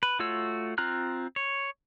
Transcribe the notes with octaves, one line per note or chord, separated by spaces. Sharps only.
B4
A3 F4 F#4 C#5 E6
C4 F4 A#5 F6 F#6
C#5